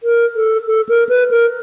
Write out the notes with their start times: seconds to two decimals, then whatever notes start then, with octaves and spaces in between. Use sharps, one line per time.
0.03 A#4
0.36 A4
0.67 A4
0.89 A#4
1.09 B4
1.31 A#4